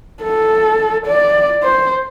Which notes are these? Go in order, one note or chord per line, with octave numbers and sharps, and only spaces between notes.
A4
D5
C5